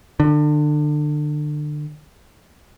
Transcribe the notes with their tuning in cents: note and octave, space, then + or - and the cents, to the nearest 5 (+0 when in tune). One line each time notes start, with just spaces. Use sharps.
D3 +30